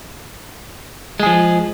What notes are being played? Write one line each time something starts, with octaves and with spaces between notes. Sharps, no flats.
F3 G#3 G#4